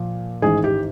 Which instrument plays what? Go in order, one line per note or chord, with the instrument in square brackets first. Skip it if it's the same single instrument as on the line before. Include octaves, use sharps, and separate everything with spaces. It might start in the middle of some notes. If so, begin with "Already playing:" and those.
Already playing: [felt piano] A#2 F3
A1 G#2 D#3 G#4
G4